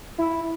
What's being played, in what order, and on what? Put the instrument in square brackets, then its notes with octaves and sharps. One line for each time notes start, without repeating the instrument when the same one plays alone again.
[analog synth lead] E4